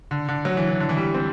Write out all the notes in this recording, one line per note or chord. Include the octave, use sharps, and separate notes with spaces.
D3
D3
F#3
E3
E3
D3
E3
G3
C4